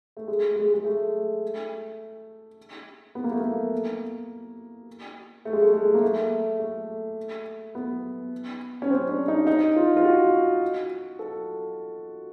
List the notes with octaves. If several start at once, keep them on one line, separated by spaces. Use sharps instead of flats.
A3
G#3
G#3
G#3
A3
B3
A#3
A3
A#3
A3
G#3
A3
G#3
A#3
A3
A3
B3
C#4
C4
D4
D#4
D#4
F4
F4
F#4
A4